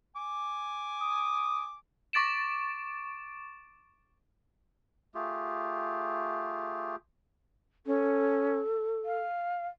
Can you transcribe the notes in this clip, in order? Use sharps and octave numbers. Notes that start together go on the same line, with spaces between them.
G#5 D6
D#6
C#6 D6 A6 D7 E7
A3 F4 G4 G#4
C#4 A4
F5